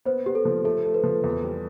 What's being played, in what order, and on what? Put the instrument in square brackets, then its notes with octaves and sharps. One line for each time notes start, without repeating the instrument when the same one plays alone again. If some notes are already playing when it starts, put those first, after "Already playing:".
[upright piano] B3 [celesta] C5
[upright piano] B3 [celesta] G4
[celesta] A4
[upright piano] F3
[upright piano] A3 [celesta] A4
[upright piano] A3
[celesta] B4
[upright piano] F3
E2
G3